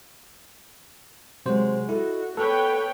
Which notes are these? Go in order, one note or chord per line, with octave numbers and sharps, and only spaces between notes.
C3 F#3 G#3 C5
E4 F#4 A4 D#5
B3 A4 B4 C#5 G5